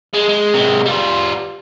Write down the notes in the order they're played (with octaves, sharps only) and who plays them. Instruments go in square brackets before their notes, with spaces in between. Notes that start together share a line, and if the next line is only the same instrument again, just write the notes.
[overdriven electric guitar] G#3
G#3
C3 G#3
G3 F4